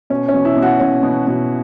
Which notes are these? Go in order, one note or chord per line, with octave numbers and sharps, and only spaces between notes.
B2 C#4
C#4
B2
E4
B2
F#4
B2 C#4
B2
B2